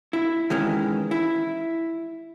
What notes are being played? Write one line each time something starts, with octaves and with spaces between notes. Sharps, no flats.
E4
D#3 E3 G#3 C#4
E4